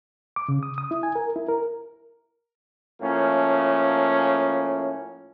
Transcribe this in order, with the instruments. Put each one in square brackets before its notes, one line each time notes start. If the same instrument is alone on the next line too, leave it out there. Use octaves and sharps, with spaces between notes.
[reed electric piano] D6
C#3
D#6
D#6
E4
G#5
A#4
E4
A#4
[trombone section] A2 F3 A#3 C#4